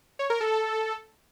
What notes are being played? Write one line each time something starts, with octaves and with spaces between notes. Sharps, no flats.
C#5
A#4
A4
A4